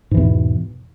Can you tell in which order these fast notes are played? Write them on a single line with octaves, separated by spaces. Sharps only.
G#2 E3 E2 B2